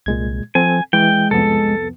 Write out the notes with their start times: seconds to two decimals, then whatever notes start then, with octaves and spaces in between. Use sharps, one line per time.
0.06 C2 A#2 G#3 G#6
0.55 F3 C4 A4 G#5
0.93 E3 G#3 G5
1.31 C2 F2 B3 A4